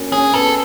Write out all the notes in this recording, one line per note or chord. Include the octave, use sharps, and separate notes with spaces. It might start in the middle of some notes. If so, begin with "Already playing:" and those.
Already playing: A#3 C#4 F#4
C#4 G#4
B3 A4